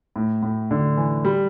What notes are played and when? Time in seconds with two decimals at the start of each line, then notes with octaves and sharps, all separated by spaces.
0.16 A2
0.43 A2
0.71 D3
0.97 E3
1.25 G3